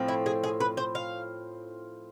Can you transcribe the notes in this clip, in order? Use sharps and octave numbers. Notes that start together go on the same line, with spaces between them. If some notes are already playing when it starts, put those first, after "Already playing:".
Already playing: A2 F3 C4
E4
G#4
G#4
B4
C5
F5